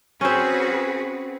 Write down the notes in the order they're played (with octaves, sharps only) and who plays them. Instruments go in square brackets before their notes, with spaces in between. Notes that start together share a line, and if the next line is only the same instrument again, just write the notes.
[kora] C4 C#4 [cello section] F#4 G#4 B4